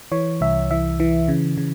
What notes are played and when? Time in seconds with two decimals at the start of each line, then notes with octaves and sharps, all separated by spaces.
0.12 E3 C#5
0.41 C2 E5
0.71 E3 E5
1.00 E3
1.28 C#3
1.58 C#3